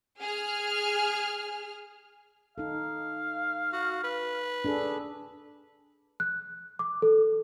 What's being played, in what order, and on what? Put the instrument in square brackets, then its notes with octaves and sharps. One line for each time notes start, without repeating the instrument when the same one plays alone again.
[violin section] G#4 F6
[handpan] D#4 A4 [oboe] F5
[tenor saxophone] F#4
B4
[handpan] D4 G#4 A4
[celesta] F#6
D6
A4